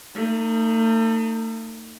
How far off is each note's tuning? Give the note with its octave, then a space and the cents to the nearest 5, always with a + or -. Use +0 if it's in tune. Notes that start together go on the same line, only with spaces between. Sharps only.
A3 +40 D#4 +0